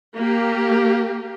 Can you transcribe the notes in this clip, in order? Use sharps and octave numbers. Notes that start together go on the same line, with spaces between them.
A#3 G4